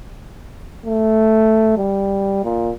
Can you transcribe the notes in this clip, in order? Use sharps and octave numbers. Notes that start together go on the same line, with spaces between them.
A3
G3
A#2